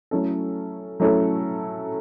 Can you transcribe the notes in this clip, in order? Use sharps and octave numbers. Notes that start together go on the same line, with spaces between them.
F#3 A3 C#4 E4 A4
F#3 A3 C#4 E4 A4